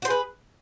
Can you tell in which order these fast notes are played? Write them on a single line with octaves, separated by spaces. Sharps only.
F#4 C5 G#4 B4